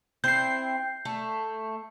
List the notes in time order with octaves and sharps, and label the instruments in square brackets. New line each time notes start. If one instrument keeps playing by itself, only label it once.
[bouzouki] C4 E4 [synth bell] G6 C7
[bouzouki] A3